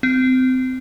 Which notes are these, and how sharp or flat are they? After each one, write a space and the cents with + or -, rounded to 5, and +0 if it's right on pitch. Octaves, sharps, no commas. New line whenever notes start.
C4 -25